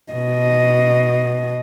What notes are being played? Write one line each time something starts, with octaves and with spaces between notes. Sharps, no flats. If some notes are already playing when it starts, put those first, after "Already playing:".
B2 D#5